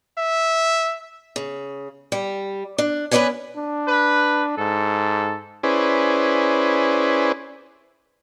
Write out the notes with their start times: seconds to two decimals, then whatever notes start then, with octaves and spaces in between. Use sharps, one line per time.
0.18 E5
1.36 C#3
2.12 G3
2.78 D4
3.11 B3 C#4 B4 D5 F#5 G#5
3.56 D4
3.88 B4
4.57 G#2 A4
5.63 C#4 E4 G#4 B4 C5 D5